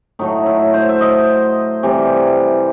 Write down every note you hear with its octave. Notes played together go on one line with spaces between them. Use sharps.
A2 F#3 A3 D#4
E4
C5
E5
D#5
C3 E3 G3